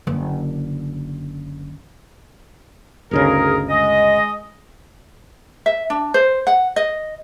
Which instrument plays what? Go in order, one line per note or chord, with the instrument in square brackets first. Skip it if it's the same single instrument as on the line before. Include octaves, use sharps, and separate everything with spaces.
[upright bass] F#1 D3
[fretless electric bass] G1 D2 C#3 [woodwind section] D#4 G#4 A#4
[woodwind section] G#3 D#5
[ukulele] E5
D4
C5
F#5
D#5